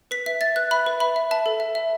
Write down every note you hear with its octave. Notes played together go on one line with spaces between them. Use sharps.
B4 B6
E5 B6
E5 A6
B4 F#6
E5 B5
B4
E5 B5
E5
E5 A5
A4
E5
E5